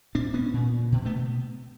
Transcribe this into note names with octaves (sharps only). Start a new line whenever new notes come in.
A#2 C4 D4
B3 C#4
A#2
B2
A3 B3